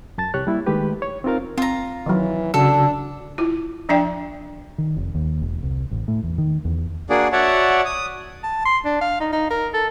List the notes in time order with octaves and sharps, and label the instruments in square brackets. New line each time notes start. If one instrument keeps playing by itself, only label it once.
[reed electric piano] F#2 A5 A6
C2 G4 C#5 F#6
G3 A#3 E4
D#3 G#3 A3 G4 B4
C#5
C4 D#4 F4 A#4 F5
[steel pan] C4 [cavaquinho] F4 A#5
[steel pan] D#3 F#3 [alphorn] E3
[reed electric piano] C#3 F#4 E6 [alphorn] D4 [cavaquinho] A4
[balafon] E4 F4
F3 D4 D5 E5 G5
[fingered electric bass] D#3
F1
D#2
E1
C2
A1
A2
E2
D#3
E2
[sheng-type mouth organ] A#3 D4 F#4 G#4 D5
F#4 C#5 D5 E5 F#5 A5
D#6
[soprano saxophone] A5
C6
D4
F5
D#4
D#4
A#4
A4